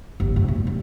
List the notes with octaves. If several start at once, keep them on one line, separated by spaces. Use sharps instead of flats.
G1
F1
B2
G3